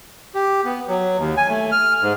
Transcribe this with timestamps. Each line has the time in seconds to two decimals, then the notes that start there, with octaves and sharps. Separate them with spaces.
0.35 G4
0.65 B3
0.88 F#3
1.17 D#2
1.37 G#5
1.48 A3
1.72 F6
2.02 G#2